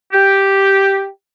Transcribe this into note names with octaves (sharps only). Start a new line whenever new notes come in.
G4